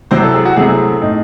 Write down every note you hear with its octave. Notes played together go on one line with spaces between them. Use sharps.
C3 F#3 C4 E4 C5
A4
G#4
F#4
C3 F#3 A3 C4 E4 G#4
A2 G#3 D#4